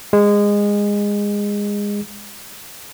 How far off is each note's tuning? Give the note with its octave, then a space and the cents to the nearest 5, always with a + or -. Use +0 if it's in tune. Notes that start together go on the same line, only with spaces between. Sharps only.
G#3 -20